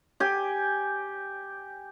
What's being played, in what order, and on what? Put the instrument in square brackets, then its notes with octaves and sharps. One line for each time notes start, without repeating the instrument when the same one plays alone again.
[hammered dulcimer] G4 G#5